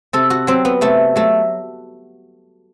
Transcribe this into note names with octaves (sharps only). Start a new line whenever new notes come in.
C3 A4
F#4
F#3 C4
B3
C3 A3
F#3 A3